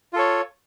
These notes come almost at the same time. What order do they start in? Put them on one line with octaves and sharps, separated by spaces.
F4 A4 C#5